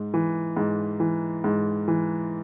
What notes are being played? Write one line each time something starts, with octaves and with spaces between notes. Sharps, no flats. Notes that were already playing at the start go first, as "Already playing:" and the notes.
Already playing: G#2
E3
G#2
E3
G#2
E3